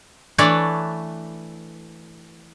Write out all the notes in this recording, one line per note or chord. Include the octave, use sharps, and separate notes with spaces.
E3 A3 D4 B4 C#5 D5